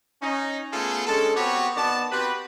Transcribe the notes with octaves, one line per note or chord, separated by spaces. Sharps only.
C#4 D#4
A3 B3 C#4 F4 G#4 A4
G#3 C#4 D4 A4
B3 C4 F#4 G4 B4 C#5
D#3 B3 F#4 D5 A5
C4 F#4 G4 B4